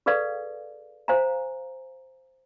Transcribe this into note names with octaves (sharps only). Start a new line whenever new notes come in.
G#4 A4 B4 D5 F5
C5 F5 G#5 A#5